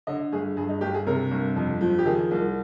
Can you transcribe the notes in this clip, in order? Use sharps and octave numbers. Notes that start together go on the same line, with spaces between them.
D3 D#5
G1 G#4
G2 G#4
D#4
G1 G4
G#4
C3 A#4
G1
F2
F3
G4
D#3 G#4
C2